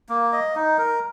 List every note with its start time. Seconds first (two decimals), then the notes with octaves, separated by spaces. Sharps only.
0.09 A#3
0.33 D#5
0.56 D#4
0.78 A#4